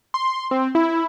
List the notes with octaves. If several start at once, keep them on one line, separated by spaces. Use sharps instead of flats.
C6
C4
E4